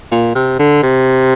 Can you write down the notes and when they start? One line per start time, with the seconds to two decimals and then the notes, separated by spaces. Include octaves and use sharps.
0.11 A#2
0.35 C3
0.59 D3
0.83 C3